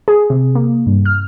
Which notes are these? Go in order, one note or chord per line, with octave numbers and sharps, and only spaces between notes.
G#4
C3
A#3
G2
F6